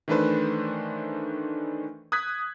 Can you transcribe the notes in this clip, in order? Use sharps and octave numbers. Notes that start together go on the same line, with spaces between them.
D#3 E3 A3 D4 B4 C5
D#6 F#6 G#6 B6